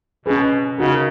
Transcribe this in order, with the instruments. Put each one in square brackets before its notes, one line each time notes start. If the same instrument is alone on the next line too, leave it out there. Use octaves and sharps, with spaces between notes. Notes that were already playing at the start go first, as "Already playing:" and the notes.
[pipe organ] B2 [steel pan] C#4 G#4 B4
[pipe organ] C#3 [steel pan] D#4 F#4 A#4